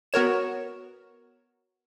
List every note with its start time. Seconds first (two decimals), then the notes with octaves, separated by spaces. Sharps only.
0.13 B3 F#4 A#4 C#5 E7